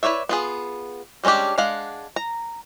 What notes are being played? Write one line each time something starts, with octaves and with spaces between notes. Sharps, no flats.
E4 B4 C#5 D5 E5
B3 F4 G#4
G3 G#3 C#4 D4 G4
G#3 D4 F5 F#5
A#5